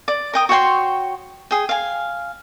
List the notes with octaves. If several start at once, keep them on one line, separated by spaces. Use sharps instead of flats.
D5
A#4 G5 D#6
F#4 C#5 G5 C6
G#4 G5
F5 G#5